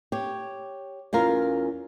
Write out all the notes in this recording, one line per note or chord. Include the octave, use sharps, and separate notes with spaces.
G4 C#5
E2 C#4 F4 A#4